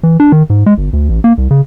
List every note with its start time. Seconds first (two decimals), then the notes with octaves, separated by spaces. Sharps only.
0.03 E3
0.20 D4
0.32 D#3
0.50 G#2
0.66 G#3
0.78 G1
0.93 D2
1.09 A1
1.24 A#3
1.38 C2
1.51 C#3